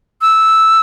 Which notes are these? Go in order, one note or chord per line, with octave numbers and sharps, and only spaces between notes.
E6